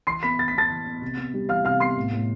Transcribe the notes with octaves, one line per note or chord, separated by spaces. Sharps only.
E3 C6 C7
B3 B5 B6
E3 A6
B6
B3 A5 A6
E3
B3
C3
B3
G3
E3 F5 F6
C3 F5 F6
B3 C6 C7
A2
A2